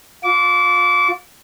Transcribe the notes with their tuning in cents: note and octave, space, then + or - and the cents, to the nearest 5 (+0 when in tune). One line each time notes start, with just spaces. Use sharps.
F4 +25 D6 -30